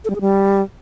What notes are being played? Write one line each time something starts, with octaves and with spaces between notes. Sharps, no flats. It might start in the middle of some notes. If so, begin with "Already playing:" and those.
A4
G3
G#4
G3